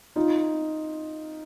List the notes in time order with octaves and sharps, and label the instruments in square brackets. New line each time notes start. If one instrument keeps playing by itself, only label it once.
[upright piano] D#4 F4